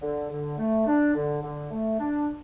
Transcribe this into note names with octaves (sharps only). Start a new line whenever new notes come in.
D3
D3
A3
D4
D3
D3
A3
D4